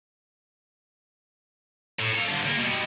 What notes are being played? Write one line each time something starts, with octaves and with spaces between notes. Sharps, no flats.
A2
A4 F5
G2 D3
C#3 A#3
B2 G3